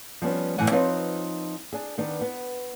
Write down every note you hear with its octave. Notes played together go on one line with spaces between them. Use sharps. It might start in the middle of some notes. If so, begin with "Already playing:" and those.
F3 G3 B3 C#4
F#2 A2 E3 F#5 G#5
F3 C4 D#4 F4 B4 C#5
D4 G#4
D#3 B3 D4
B3